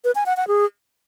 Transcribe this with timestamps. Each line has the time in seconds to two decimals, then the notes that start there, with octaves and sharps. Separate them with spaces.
0.04 B4
0.15 G#5
0.26 F#5
0.37 F#5
0.48 G#4